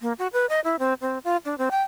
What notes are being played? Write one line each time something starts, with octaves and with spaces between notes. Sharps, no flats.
A#3
F#4
B4
D#5
E4
C4
C4
F4
D4
C4
G5